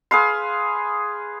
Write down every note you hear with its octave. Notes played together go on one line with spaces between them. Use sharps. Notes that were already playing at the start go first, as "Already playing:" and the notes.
G#4 B4 F5 C6